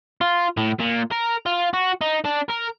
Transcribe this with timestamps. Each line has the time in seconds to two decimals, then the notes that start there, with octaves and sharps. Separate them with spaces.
0.21 F4
0.57 A2
0.80 A#2
1.11 A#4
1.46 F4
1.73 F#4
2.01 D#4
2.25 D4
2.50 A#4